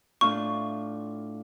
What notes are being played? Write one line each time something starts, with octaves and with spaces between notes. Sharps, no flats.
A2 D4 F4 C#6